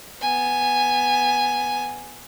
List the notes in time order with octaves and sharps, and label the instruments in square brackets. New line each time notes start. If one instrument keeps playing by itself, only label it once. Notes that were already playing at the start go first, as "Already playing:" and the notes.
[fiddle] B3 G#5